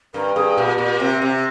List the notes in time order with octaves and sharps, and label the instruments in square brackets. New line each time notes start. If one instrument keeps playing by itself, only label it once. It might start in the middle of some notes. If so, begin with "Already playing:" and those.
[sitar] G2 [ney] A#4
[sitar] G2 [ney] G#4
[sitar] A#2 [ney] G4
[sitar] A#2
C3
C3